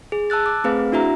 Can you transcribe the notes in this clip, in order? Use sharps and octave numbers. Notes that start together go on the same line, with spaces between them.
G#4
A5 E6 F#6 A6
D6
A3 C4 G#4 B4 F5
D4 E4 F#4 E5 A#5